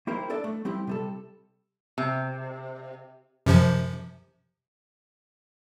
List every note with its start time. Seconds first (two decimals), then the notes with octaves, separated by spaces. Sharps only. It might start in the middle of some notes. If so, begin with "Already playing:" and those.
0.07 A#3 E4 G4 A#4 C5
0.30 D4 A4 D5 E5
0.44 A3
0.65 G3 C4 E4 G4
0.87 C3 G3 A4
1.98 C3
3.46 F#2 C3 F3